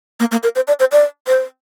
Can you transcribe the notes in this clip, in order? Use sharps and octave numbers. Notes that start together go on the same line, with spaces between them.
A#3
A#3
A#4
C5
D5
C5
D5
C5